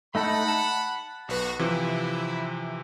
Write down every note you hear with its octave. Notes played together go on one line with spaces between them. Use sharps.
A3 D#4 A4 F#5 B5
A5
B1 F#4 B4
C3 E3 F3 E4